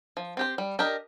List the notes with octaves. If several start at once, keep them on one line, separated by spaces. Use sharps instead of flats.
F3
C4 G4 C5
G3
D4 G4 A#4 D#5